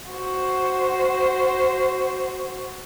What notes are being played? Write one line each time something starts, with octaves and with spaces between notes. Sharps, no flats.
F#4 C5